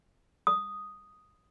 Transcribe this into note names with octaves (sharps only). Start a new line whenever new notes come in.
D#6